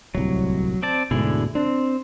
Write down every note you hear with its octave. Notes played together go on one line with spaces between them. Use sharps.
D1 C2 F#3
C4 D5 A5
D2 G#2 B2 D3 E4 G#4
C4 D4